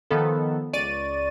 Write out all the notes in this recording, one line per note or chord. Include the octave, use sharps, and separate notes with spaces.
D#3 F3 B3 A4
C#2 D5 C#6 A6 D#7